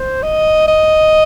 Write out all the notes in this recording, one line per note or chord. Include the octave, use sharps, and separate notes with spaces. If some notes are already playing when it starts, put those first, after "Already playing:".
Already playing: C5
D#5
D#5